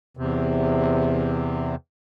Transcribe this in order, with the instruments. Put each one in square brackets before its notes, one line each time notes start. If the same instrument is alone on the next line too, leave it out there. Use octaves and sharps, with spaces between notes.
[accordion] E2 C3